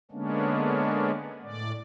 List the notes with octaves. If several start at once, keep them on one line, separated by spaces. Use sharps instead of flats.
D3 G#3 A#3 B3 C#4 D4
A2 D5